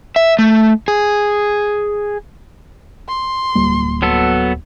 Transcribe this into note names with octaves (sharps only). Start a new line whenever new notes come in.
E5
A3
G#4
C6
D1 G3 A#3
F#3 B3 A4